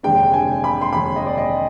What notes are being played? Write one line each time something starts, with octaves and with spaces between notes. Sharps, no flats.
F1 D#2 D3 G#3 D4 G5
G#5
B5
C6
F1 D#2 D3 G#3 D4 B5
D#5
D5
D#5